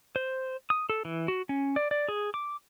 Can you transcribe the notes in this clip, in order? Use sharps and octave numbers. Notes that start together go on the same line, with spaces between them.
C5
D#6
A4
E3
F#4
C#4
D5
D5
G#4
D6